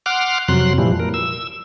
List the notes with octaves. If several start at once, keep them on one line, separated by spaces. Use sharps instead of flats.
F#5 C6 D6 F6
F2 C3 F#3 C6 F#6
A#2 E3 F3 G3
A#4
E6